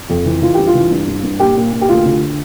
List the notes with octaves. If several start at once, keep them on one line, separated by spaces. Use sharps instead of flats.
F2
E3
E3 F4
G2 G4
F4
E3
G2
G2
G2
A#2 G4
A#2
A#2
G4
D2 F4
D3